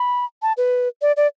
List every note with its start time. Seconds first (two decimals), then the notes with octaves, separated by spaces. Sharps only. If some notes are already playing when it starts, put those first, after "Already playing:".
Already playing: B5
0.42 A5
0.57 B4
1.02 D5
1.17 D5